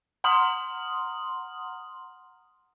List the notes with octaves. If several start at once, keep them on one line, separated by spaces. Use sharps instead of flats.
F#5 A#5 C6 D#6 F6 F#7